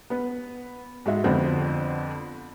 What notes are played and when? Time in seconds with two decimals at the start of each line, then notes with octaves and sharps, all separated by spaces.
0.10 B3 B4
1.06 G#2 G#3 F#4 E5
1.24 F2 D3 B3 C4 D4